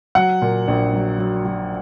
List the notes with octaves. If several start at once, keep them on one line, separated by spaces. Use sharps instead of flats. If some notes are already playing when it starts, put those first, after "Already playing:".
F#3 F#5
A#2
A#1
F#3
F#3
F#3